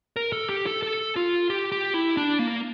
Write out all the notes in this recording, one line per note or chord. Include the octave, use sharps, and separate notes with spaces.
A#4
A4
G4
A4
A4
F4
G4
G4
E4
D4
A#3